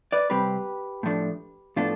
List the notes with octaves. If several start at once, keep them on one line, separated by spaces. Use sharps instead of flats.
B4 D5
C3 G3 C4 G4 B4
A2 F3 A3 D4
A2 F3 B3 D4 F4 A4